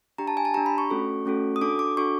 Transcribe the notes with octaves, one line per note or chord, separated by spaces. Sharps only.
D4 G4 A#5
A5
G#5
A5
D4 G4 A#5
B5
C#6
A3 C#4 F#4 A4
A3 C#4 F#4 A4
D#6
D4 F#4 A4 D6
D6
D4 F#4 A4 C#6